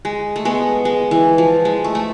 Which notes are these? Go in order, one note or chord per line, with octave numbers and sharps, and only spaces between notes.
G#3
A3
G#3 B3
G#3
E3
F3
G#3
A3
A3